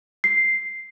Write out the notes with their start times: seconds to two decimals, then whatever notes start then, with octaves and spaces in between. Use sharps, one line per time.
0.24 C7